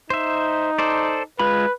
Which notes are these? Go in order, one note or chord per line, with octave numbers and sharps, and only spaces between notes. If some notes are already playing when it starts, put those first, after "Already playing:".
D#4 C5 E5
A4 C5 D5
G#3 F4 B4 B5